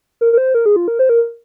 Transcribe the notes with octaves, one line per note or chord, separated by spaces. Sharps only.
A#4
A#4
C5
A#4
G#4
F4
A#4
C5
A#4